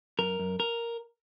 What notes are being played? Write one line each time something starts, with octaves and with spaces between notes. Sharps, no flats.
F#2 A#4
F#2
A#4